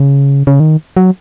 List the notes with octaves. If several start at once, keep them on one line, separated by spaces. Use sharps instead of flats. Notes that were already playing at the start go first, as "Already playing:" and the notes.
Already playing: C#3
C#3
D#3
F#3